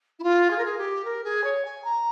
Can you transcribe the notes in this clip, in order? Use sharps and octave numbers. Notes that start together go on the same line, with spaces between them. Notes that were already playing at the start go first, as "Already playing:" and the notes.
E4
F4
G#4
A#4
G#4
G4
A#4
G#4
C#5
G#5
A#5